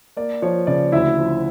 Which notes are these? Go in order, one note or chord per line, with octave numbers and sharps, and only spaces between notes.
A#3 D5
F3 C#5
C#3 D5
D2 E4 E5
F3